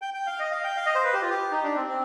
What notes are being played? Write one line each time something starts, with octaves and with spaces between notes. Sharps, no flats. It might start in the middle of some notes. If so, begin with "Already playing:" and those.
G5
G5
F5
D#5
F5
G5
F5
D#5
C5
B4
G4
F4
G4
D#4
D4
C4
C4